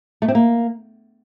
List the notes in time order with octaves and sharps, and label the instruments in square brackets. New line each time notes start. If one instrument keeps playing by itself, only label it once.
[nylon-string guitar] A3
C4
A#3